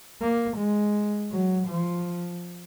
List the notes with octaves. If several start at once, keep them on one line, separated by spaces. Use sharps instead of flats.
A#3
G#3
F#3
F3